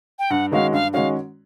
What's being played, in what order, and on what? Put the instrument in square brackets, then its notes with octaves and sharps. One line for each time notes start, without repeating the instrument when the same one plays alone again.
[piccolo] G5
[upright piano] G2 [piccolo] F#5
[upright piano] D#3 G#3 C#4 F#4 [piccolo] F5
[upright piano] G2 [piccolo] F5
[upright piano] D#3 G#3 C#4 F#4 [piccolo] F5